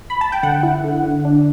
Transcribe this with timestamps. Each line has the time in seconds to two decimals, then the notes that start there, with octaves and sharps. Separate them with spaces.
0.10 B5
0.21 A5
0.32 G5
0.43 D3 F#5
0.63 E4
0.84 D3
1.04 D3
1.25 D4